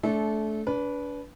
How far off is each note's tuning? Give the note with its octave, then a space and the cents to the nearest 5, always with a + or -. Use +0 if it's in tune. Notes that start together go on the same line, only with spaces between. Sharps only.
A3 -20 D4 -35 A4 -25
D4 -35 B4 -10